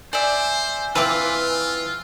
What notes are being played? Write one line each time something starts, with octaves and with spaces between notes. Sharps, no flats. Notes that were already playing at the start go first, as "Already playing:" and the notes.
C5 D5 E5 G#5
E3 C4 F4 B4 F5 D6